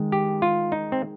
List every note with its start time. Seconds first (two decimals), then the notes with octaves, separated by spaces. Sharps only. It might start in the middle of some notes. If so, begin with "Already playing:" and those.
Already playing: D#3 G#3
0.12 G4
0.42 F4
0.72 D#4
0.92 C4